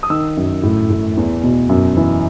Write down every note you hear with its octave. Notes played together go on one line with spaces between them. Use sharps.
D#6
D#3 E6
F#2
A2
A2
E2
B2
F#2
E3